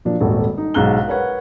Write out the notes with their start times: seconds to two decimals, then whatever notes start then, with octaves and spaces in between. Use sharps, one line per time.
0.05 A#2 F3 D4
0.20 D#1 G#1 F#4 A4
0.58 D#4
0.74 B1 G#2 F5 A#5 F#6 G7
1.08 A#4 B4 C#5 F#5